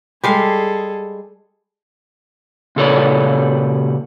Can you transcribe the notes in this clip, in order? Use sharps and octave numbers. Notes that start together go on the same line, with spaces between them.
G3 G#3 G#4 A4 F5
A#2 C#3 A4 B4 C#5 D5